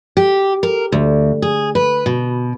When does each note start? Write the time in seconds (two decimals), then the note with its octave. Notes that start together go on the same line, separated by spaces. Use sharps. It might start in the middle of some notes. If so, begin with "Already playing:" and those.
0.17 G4
0.63 A#4
0.92 D2
1.42 G#4
1.75 B4
2.06 B2